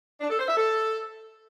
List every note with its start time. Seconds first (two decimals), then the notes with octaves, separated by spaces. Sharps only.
0.21 D4
0.30 A4
0.39 C5
0.48 E5
0.57 A4